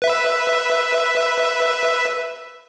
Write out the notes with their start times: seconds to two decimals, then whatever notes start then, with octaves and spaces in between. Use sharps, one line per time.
0.02 B4 E5